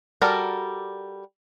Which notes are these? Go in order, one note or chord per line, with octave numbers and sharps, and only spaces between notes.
G3 F#4 A4 A#4 D5